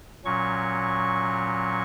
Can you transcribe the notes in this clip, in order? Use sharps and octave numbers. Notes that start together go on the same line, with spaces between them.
A#2 F#3 C#4 C#6